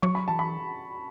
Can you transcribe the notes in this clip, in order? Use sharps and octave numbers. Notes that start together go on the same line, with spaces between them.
F#3 C#6
B5
E3 A5
B5